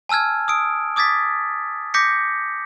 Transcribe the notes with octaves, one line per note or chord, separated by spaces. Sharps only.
G#5 A5 E6 F6 G#6
D#6 E6 D7
D6 D#6 G#6 A6 B6
D6 G6 A#6 B6 C#7